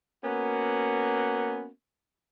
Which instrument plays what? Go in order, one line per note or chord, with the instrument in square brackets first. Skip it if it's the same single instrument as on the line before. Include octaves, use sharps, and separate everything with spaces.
[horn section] A#3 B3 C#4 F#4